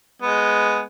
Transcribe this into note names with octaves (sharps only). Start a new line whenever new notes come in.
G#3 B3